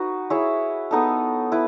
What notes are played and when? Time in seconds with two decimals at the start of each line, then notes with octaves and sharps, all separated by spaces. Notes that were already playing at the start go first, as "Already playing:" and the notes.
Already playing: D#4 F#4 B4
0.30 E4 G#4 C#5 E5
0.91 B3 D#4 A4
1.52 E4 B4